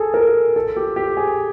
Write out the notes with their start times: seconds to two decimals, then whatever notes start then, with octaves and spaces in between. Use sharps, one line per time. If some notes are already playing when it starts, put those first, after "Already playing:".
Already playing: G#4 A4
0.14 A#4
0.56 A4
0.77 G4
0.96 G4
1.17 G#4